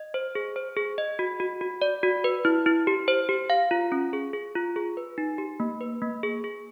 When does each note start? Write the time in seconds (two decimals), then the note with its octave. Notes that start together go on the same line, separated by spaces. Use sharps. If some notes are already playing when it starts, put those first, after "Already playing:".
Already playing: D#5
0.14 C5
0.35 G#4
0.56 C5
0.77 G#4
0.98 D#5
1.19 F#4
1.40 F#4
1.61 F#4
1.82 D5
2.03 F#4
2.24 B4
2.45 E4
2.66 E4
2.87 G4
3.08 C5
3.29 G4
3.50 F5
3.71 F4
3.92 C#4
4.13 G#4
4.33 G#4
4.55 F4
4.76 G#4
4.97 B4
5.18 D#4
5.38 G4
5.60 A#3
5.81 B4
6.02 A#3
6.23 G#4
6.44 G#4